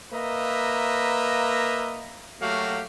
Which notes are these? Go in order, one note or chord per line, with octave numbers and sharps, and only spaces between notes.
A#3 B4 D#5 E5 A#5
F#3 A3 A#3 F#4 G4 F5